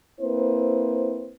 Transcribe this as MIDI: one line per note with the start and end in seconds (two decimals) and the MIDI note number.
0.19 1.33 58
0.19 1.33 60
0.19 1.33 64
0.19 1.33 71
0.19 1.33 72